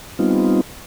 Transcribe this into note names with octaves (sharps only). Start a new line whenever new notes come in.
G3 B3 C4 D#4 F4